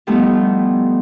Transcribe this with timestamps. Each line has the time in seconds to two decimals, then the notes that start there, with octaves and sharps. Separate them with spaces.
0.07 F3 G3 A3 B3 D#4 E4